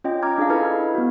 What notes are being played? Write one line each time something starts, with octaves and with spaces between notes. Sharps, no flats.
C#4 F4 D#5 G5
A#5 D6 F6 G#6
D4 G#4 D#5 F5
E4 A4 B4 F6 G#6
B3 F#4